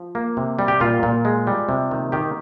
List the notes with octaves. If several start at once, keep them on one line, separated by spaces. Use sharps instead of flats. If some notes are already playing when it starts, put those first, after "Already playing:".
Already playing: F3
A#3
C3
G3
G4
A#2 F4
A#2
G#3
G3
C3
D#3
D#3 G4